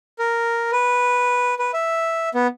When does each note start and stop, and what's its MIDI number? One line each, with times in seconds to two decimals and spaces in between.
0.19 0.71 70
0.72 1.55 71
1.59 1.71 71
1.73 2.29 76
2.34 2.47 59